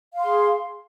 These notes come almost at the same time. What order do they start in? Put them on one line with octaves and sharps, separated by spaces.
F5 C6 G#4